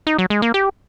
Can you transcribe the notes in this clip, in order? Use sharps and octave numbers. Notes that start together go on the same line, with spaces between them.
D#4
F#3
G#3
A#3
G4